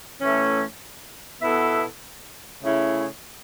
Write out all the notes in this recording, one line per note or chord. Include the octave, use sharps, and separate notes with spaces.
A2 E3 A3 C#4
B2 B3 E4 A4 E5
C#3 A3 C#4 E4